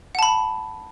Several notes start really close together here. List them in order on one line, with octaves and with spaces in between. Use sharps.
F#5 A5 B5